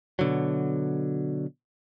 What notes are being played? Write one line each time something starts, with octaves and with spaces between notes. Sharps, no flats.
B2 D3 F#3